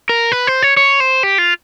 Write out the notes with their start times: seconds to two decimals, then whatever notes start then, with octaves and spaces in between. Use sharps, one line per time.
0.09 A#4
0.32 B4
0.47 C5
0.62 C#5
0.77 C#5
1.00 C5
1.23 G4
1.38 F4